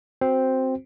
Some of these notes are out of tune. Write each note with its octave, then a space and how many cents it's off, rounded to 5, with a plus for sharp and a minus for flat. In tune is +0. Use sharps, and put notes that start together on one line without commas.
C4 +0 F#4 +0 C5 +0